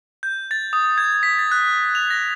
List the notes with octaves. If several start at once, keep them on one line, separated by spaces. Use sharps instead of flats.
G6
A6
D#6
G#6
B6
A6
F#6
F7
A#6